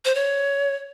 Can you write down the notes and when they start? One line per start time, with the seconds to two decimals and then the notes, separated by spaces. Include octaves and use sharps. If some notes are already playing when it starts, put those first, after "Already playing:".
0.05 C5
0.15 C#5